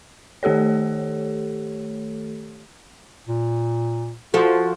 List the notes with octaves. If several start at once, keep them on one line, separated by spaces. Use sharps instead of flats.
D#3 A3 G4 A4 C#5
A#2
F3 F#4 A4